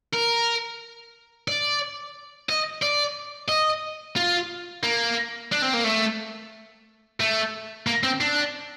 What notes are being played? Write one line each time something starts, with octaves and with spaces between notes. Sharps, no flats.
A#4
D5
D#5
D5
D#5
F4
A#3
D4
C4
A#3
A3
A3
A#3
C4
D4